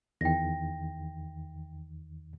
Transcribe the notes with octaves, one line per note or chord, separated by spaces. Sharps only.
E2 D#3 G5 A#6